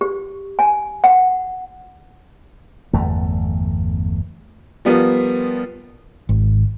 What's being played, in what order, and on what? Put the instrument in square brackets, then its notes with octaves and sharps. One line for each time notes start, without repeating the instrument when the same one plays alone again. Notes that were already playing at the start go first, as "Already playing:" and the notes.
[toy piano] G4
G#5
F#5
[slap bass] G1 E2 A3
[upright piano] F3 G3 B3 F4 A#4
[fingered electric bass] G#1